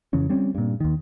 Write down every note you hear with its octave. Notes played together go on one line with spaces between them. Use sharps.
F2 C#3 E3 C#4
G3 C4 C#4
G2 A#2
D#2 D#3